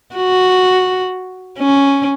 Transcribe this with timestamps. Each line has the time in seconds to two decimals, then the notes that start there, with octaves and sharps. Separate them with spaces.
0.15 F#4
1.59 C#4